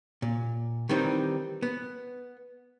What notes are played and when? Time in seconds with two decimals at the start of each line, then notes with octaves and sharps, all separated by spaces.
0.22 A#2
0.89 D#3 E3 G3 C4 D#4
1.63 B3